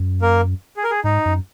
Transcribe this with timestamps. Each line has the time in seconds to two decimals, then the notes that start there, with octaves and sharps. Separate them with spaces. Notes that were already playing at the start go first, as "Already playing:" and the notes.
Already playing: F#2
0.22 A#3 A#4
0.77 G#4
0.84 A#4
0.91 G#4
1.04 G#2 D#4
1.26 F#2